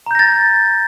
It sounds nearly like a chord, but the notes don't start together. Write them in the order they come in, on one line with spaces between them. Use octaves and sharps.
A#5 G6 A#6 A6